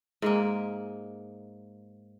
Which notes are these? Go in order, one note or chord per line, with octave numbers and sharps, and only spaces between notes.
G#2 G#3 A#3